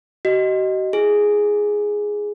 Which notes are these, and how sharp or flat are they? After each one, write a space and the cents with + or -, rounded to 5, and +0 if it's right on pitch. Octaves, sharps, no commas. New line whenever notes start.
F#4 +45 D#5 +0
E4 +0 G#4 +0